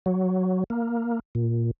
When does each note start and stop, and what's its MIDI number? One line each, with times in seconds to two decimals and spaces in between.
0.06 0.64 54
0.70 1.19 58
1.35 1.71 46